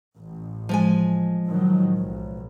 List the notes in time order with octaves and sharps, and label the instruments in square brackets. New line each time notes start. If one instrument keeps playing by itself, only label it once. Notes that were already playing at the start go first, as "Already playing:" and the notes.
[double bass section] A1
[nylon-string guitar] F3 G#3 G#5
[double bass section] A2 D#3 F#3
B1